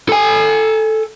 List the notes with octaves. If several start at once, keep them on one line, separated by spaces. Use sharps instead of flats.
A4 G#5